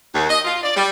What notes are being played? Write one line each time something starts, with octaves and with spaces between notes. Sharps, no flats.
D#2
D#5
F4
D5
G3